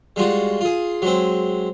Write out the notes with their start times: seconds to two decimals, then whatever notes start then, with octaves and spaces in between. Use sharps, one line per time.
0.16 G3 G#3 F4 F#4
0.61 F4 G#4
1.02 F#3 G#3 C4